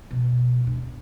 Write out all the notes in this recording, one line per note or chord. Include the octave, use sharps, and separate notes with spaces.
B2
D4